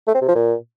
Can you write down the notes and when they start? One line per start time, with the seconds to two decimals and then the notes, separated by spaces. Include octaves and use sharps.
0.08 A3
0.15 C4
0.21 C3
0.28 F3
0.35 A#2